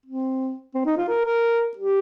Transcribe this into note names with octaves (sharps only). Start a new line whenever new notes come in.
C4
C4
D#4
F4
A#4
A#4
G4